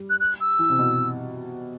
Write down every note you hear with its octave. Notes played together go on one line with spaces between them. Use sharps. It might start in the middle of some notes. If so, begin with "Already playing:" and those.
Already playing: G3
F#6
F#6
E6
E3
C3
B2